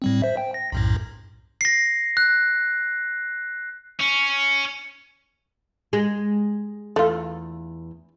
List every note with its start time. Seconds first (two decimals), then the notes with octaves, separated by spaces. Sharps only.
0.02 A2 G3 C4
0.22 C5 E5
0.37 G5
0.54 A#6
0.72 B1 F#2 A2
1.61 A#6 C7
2.17 F#6
4.00 C#4
5.93 G#3
6.96 E2 A3 F4